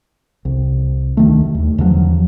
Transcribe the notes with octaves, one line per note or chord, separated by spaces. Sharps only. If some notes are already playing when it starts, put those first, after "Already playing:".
C2
D2 D#3 A3
D#2
E2 D3 F3 F#3